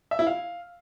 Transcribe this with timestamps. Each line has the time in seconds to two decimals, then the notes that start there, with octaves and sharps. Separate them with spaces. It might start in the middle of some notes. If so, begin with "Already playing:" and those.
0.11 E5
0.19 E4
0.27 F5